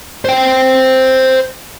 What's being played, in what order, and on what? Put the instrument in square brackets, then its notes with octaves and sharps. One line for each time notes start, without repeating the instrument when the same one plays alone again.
[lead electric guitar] C5 G5